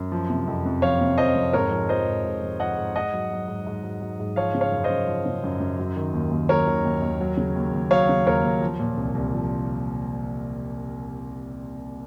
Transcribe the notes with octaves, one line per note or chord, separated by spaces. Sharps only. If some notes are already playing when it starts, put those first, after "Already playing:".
Already playing: F#2
F3
C3
F2
F2
F3 C#5 F5
C3
F2 C5 D#5
F2
G#2 A#4 C#5
F3
F3 C5 D#5
G#2
G#2
F3
F3 D#5 F#5
G#2
G#2 D#5 F#5
F#3
F#3
G#2
G#2
F#3
F#3
G#2
F3 C#5 F5
C#3
C#5 F5
F#2
C5 D#5
F#2
F3
C#3
F#2
F#2
F#3
D#3
D#2
D#2
F#3 A#4 C#5
D#3
D#2
D#2
F#3
C#3
D#2
D#2
F#3 C#5 F5
C#3
D#2 A#4 C#5
D#2
F3
A#2
C2
C2
F3